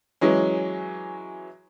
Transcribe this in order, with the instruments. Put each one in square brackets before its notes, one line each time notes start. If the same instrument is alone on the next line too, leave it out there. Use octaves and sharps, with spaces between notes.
[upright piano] E3 F#3 G#3 C#4